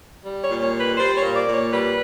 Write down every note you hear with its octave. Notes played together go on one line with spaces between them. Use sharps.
G3
C#5
A#2
C#5
G3
B4
G3 C5
C#5
A#2
D5
A#2
C#5
G3 B4